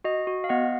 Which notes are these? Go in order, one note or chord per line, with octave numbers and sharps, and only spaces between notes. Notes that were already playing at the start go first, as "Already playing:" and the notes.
F#4 D#5
F#4
F5
B3 D#5 F#5